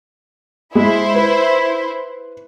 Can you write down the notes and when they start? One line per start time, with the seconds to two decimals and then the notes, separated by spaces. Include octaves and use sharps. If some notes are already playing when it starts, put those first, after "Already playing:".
0.75 G#3 E4 C5
1.15 B4